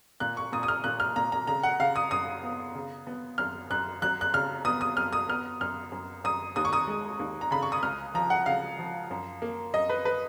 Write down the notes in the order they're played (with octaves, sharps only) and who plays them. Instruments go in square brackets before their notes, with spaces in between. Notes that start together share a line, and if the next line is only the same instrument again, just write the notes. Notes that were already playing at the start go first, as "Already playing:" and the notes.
[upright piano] A#2 F#6
C#6
A#2 D#6
D#6
F6
A#2 F#6
F6
A#2 A#5
A#5
C#3 A#5
F#5
C#3 F5
D#6
F#2 D#6
B3
C#3
B3
F#2 F6
F#2 F#6
F#3 F#6
F#6
C#3 F6
B3 D#6
D#6
F#2 F6
D#6
B3 F6
F#2 F6
F#2
F#2 D#6
D#2 D#6
C#6
D#6
G#3
D#2
A#5
C#3 B5
C#6
D#6
C#2 F6
F3 A#5
F#5
C#3 F5
F3
F#2
A#3
F#2 D#5
B4
B4